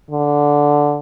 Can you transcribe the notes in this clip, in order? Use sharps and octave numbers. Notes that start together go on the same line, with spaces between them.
D3